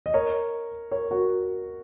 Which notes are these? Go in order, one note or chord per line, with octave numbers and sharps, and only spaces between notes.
D#5
A#4 C#5
A#4 C#5
F#4 A#4